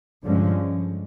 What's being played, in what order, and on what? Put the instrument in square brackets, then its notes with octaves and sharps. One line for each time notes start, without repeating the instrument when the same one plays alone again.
[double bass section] G2 D3 F3 G#3 C#4